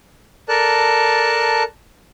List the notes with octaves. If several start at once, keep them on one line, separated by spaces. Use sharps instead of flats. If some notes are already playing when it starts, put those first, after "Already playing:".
A4 A#4 D5 A5 F#6